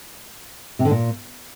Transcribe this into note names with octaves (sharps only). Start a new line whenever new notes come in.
C3
D3
A#2